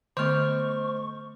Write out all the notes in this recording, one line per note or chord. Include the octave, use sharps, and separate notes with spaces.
D3 A3 B3 C5 D#5 C#6 D6 F6